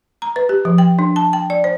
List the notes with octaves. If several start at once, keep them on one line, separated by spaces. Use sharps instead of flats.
A#5
B4
G4
F3
G5
D4
A5
G5
D5
C5